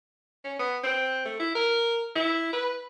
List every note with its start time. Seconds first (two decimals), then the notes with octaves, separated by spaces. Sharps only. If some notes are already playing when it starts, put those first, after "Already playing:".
0.44 C#4
0.59 B3
0.83 C4
1.25 A3
1.39 E4
1.55 A#4
2.15 E4
2.53 B4